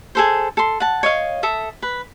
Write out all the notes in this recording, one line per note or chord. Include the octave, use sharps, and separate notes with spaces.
G#4 A4 C5
A4 C6
F#5 A5
C#5 D#5 F5
A4 E5 D#6
B4